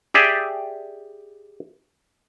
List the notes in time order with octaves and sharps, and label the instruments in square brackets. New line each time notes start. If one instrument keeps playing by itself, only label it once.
[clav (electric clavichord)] G4 G#4 D5 E5 G5 G#5